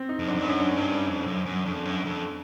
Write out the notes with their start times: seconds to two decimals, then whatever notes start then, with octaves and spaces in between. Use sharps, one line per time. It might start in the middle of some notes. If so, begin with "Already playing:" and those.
Already playing: C4
0.09 D#4
0.19 F2
0.27 F#2 D4
0.35 F2
0.41 G2
0.48 F#2 C#4
0.60 D4
0.72 C#4
0.77 G2
1.07 F2
1.26 F#2
1.46 F#2
1.65 F2 D4
1.85 F#2
2.05 F2